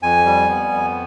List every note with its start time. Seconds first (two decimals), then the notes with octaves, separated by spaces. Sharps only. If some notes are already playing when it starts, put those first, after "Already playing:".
0.02 F2 G#5
0.26 G3
0.48 B3
0.72 F2